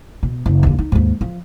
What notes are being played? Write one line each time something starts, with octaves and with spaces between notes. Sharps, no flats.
B2
F#1
D#2 D3
D#4
D#2 G#2
F3